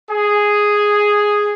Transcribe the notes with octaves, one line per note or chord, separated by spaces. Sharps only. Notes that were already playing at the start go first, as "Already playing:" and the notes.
G#4